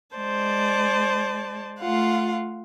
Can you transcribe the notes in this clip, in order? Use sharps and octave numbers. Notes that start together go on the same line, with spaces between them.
G#3 C5 D5 A5
A3 F4 F5 F#5